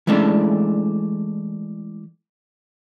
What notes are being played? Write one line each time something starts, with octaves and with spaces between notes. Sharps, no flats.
E3 G#3 A3 C#4 D4